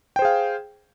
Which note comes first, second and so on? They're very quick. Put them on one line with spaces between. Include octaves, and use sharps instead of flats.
G5 C5 G#4 F5